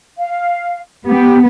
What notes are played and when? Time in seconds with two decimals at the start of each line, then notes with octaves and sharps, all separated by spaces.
0.18 F5
1.05 B3 G4